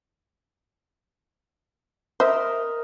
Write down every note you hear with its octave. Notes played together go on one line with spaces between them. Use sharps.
A#4 C5 D#5 E5